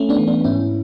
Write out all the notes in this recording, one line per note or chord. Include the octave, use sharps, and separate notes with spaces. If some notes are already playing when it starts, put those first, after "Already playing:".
Already playing: A3 C#4
B3 D4
E3
B3 D4
G#2 C#4 E4